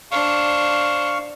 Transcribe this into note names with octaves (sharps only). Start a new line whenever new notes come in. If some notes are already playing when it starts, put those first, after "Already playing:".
D4 C5 F5 C#6